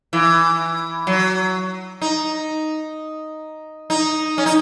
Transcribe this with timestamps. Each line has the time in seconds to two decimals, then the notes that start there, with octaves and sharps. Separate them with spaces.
0.13 E3
1.07 F#3
2.01 D#4
3.90 D#4
4.38 C#4
4.46 D#4